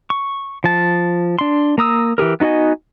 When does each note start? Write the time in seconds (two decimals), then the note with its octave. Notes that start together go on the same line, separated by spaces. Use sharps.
0.10 C#6
0.64 F3 A5
1.39 D4 C6
1.78 A#3 A#5 D#6 E6
2.18 E3 G4 G#4 A#4
2.40 B3 D#4 F#4 D#5 G#5